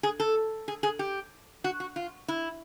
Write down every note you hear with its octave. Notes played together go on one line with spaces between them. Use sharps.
G#4
A4
G#4
G#4
G4
F#4
F#4
F4
E4